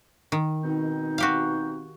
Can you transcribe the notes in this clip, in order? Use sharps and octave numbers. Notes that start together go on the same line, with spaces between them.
D#3
B2 C4 D#4
F#4 G4 F5